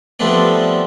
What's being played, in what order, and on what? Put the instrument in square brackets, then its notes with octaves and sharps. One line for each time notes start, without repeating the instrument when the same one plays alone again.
[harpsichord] F3 G3 A3 B3 C4 D4